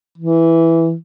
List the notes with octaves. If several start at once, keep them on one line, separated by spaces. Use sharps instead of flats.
E3